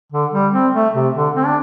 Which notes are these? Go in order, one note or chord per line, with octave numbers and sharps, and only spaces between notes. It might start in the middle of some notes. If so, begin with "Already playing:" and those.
D3
G3
C4
A3
C3
D3
C4
D4